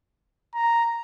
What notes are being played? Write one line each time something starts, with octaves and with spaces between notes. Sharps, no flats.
A#5